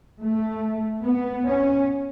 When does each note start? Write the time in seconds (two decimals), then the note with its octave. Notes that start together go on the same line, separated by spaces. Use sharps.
0.21 A3
1.05 B3
1.47 C#4